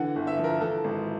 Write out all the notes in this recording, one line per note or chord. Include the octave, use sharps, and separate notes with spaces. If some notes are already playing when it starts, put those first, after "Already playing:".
Already playing: D3 E3 F#5
G1
E5
F3
A#4
E3 A4
G#1